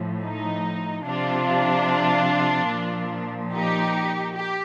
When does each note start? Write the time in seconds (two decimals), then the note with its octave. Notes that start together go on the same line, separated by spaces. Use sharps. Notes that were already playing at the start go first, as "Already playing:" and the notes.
Already playing: A2 F3
0.23 D#4
1.04 C3 F3 D4 F4
2.70 A#2 F3
3.52 D#4 G4
4.34 G4